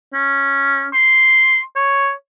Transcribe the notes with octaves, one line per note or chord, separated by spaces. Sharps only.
C#4
C6
C#5